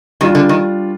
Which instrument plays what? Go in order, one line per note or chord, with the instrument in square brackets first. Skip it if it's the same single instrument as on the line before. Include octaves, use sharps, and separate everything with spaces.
[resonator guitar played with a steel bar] D#3 [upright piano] G3 D4 F4
[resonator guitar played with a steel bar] D3
D#3